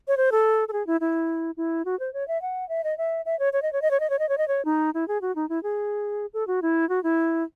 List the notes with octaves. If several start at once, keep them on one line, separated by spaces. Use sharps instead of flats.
C#5
C5
A4
A4
G#4
E4
E4
E4
F#4
C5
C#5
E5
F#5
E5
D#5
E5
E5
C#5
C#5
D#5
C#5
D#5
C#5
D#5
C#5
D#5
C#5
D#5
C#5
D#4
E4
G#4
F#4
D#4
E4
G#4
A4
F#4
E4
F#4
E4